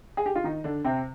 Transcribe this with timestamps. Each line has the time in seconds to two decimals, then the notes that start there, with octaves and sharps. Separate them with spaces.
0.17 G#4
0.26 G4
0.35 F4
0.44 D#3 D#4
0.64 D3 D4
0.84 C3 C4